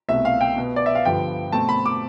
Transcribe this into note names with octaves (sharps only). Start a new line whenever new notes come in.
C2 B2 A3 E5
F5
G5
B2 B3
D5
E5
F5
G2 D3 F3 B3 G5
B2 A3 C4 A5
B5
D6